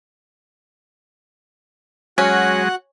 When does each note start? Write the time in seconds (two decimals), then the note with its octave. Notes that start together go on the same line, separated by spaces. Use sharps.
2.18 F#3 G#3 C#4 F#4 F#5 F#6